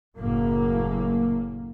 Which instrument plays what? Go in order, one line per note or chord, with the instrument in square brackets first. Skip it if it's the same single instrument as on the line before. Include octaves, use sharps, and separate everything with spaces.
[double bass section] F#1 F#2 A2 A#3